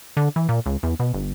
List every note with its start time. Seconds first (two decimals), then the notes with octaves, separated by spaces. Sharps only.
0.17 D3
0.36 E3
0.49 A#2
0.66 C#2
0.83 E2
1.00 B2
1.14 G1